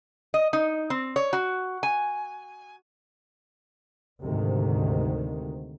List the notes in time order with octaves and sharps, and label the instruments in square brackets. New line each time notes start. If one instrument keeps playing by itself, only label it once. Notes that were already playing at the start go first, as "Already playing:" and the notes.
[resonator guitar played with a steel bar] D#5
D#4
C4
C#5
F#4
G#5
[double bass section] D2 G#2 C3 D#3